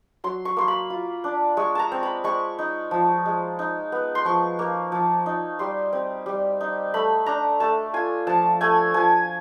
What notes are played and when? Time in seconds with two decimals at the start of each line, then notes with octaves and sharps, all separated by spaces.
0.24 F#3 C6
0.45 C#6
0.57 A#3 C6
0.68 B5
0.90 F4
1.24 D4
1.57 G#3 C#6
1.75 A5 A#5
1.92 C4
2.03 B5
2.24 G#3 C#6
2.59 D#4
2.91 F3
3.26 G#3
3.59 D#4
3.92 B3
4.15 C6
4.25 F3 C#6
4.59 A#3
4.92 F3
5.26 D#4
5.59 G3 C6
5.93 C4
6.26 G3
6.61 D#4
6.94 A3 B5
7.26 D4 A#5
7.60 A3 A5
7.94 F4 G#5
8.27 F3 A5
8.61 A3 G#5
8.94 F3 G#5